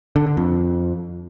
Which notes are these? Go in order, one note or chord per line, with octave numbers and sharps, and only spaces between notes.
D3
D3
F2